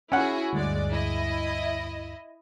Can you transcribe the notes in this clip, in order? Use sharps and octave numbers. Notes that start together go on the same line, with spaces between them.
C#4 E4 F#4 G#4 F#5
D2 G2 G#3 D5
E4 D#5